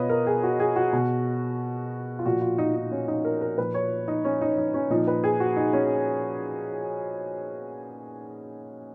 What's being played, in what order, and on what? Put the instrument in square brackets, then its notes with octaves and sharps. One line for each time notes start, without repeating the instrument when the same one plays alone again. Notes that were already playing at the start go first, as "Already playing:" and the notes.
Already playing: [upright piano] B2 F4 B4 C#5 D#5
A#4
G#4
F#4
G#4
F#4
B2
F4
A#2 F3 F#4
F4
D#4
D#4
C#4
D#4
A#4
A#4
A#2 F3 B4
C#5
D#4
C#4
D#4
D#4
C#4
A#2 F3 D#4
B4
G#4
F#4
D#4
C#4